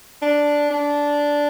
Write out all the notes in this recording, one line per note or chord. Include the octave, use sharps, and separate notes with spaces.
D4
D4